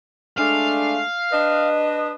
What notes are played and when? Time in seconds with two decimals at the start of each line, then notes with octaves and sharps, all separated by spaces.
0.38 G#3 A3 D4 F5
1.32 D4 B4 D#5